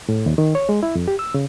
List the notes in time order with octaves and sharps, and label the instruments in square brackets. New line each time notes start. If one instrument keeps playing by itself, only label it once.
[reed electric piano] A2
D#2
D#3
C#5
G#3
E4
F2
G4
E6
C#3